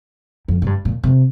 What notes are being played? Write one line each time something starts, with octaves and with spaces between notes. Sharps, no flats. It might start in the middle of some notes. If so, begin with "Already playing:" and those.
F2
A#2
G2
A#2
C3